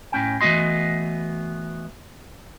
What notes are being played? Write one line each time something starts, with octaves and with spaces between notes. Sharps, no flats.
A2 C#4 G5
E3 A3 B3 F#4 D#5 C6